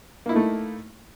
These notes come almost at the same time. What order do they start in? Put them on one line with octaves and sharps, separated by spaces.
A#3 E4 D#4 A3